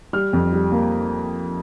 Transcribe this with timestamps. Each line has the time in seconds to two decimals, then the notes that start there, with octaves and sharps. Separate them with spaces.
0.13 G3 F6
0.33 F2
0.53 G3
0.72 A#3